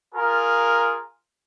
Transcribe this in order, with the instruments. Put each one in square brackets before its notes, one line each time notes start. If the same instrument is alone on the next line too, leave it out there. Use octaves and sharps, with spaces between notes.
[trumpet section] F4 G#4 A#4